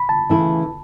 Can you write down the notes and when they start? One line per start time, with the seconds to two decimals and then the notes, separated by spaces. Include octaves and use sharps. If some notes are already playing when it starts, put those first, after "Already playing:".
Already playing: B5
0.09 A5
0.29 C#3 E3 A3 E4